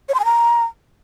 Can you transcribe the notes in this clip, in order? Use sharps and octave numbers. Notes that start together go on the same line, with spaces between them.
C#5
C6
G#5
A#5